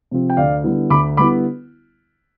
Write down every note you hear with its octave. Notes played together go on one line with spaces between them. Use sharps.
C3 F3 C4
G5
D2 D5 F5
D3 G3 B3 E4
D2 B5 D6
D3 G3 B3 E4 B5 D6